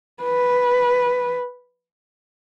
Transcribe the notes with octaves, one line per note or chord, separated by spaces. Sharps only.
B4